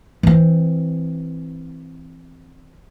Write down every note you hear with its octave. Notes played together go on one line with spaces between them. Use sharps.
E3 C4